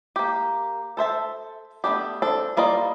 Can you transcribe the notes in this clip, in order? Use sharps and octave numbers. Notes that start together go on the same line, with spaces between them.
A#3 G4
A4 C5 E5 A5
A3 B3 D4 G4
C4 D4 A4
G3 A#3 F4 D5 D#5